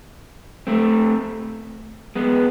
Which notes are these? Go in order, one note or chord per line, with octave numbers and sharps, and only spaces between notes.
A3 C4
G#3 B3